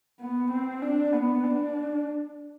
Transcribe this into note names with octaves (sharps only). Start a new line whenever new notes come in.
B3
C4
D4
B3
D4